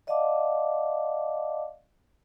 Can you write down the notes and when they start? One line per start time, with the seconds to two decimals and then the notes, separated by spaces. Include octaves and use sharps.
0.07 D5 D#5 F5 F#5 A5 D6